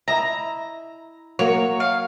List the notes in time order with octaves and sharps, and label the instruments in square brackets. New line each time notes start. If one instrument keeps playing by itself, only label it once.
[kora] E4 D#5 E5 [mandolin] A#5
[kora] F#3 A#3 [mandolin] C#5
[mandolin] F5